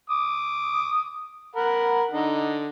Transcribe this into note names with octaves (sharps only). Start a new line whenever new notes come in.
D6 D#6
A#4 F#5 B5
D3 D#4